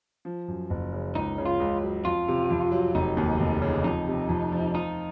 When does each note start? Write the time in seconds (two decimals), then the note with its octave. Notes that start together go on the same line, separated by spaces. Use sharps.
0.25 F3
0.48 F#2
0.70 F#1
0.93 C#3
1.15 C#2 D#4
1.38 C#3
1.46 F4
1.60 C#2
1.82 F#3
2.05 F2 F4
2.28 C3
2.51 F2
2.72 F#3
2.95 F1 D#4
3.17 D#2
3.40 F1
3.62 C#3
3.84 F2 D#4
4.08 C3
4.29 F2
4.52 F3
4.74 D#4 F4